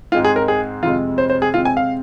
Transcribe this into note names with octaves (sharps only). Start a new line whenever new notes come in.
G#2 G#3 C4 F4
G#4
A#4
G#4
F2 C3 G#3 F4
C5
C5
G#4
C3 G#3 C4 F4
G#5
F5